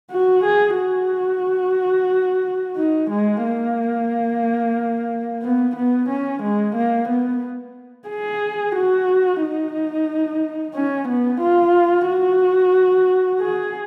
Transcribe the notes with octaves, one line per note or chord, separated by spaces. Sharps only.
F#4
G#4
F#4
D#4
G#3
A#3
B3
B3
C#4
G#3
A#3
B3
G#4
F#4
D#4
C#4
B3
F4
F#4
G#4